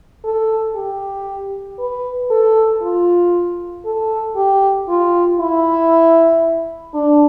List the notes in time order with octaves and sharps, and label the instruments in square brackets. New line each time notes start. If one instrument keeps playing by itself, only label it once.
[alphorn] A4
G4
B4
A4
F4
A4
G4
F4
E4
D4